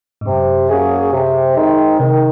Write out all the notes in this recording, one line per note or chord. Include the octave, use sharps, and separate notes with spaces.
G#2
F#2 C3
F#3 A#3 C#4 G#4
C3
D#3 G#3 C4 D#4
C3 D#3